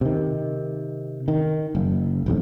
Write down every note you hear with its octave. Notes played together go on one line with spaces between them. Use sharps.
C3 D#3
D#3
F#1
E1 B1 F2